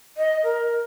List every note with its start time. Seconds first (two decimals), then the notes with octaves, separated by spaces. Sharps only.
0.17 D#5
0.44 A#4